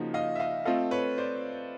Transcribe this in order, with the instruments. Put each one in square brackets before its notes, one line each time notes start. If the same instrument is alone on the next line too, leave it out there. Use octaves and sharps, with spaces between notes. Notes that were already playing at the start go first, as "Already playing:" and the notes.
Already playing: [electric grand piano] C#3 F3 A#3 D#4 F#4
[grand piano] D#5 F5
E5
D#5 F5
[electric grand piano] A3 C4 F4 A4 [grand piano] D#5 F5
[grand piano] B4 C#5
C5 D5